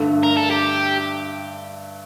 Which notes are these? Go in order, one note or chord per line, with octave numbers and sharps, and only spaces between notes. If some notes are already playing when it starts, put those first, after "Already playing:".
Already playing: G2 D3 A3
A#4
A4
G4